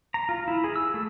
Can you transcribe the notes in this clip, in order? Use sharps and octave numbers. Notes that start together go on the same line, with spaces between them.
A#5
F4
E4
G#4
E6
A3